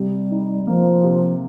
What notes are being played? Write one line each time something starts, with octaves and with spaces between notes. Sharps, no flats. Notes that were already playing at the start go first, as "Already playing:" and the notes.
Already playing: C3 G3
D#4
F3 A#3
C3